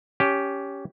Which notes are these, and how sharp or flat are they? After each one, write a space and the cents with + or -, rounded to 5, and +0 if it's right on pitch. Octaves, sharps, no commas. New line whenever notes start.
C#4 +15 G4 +0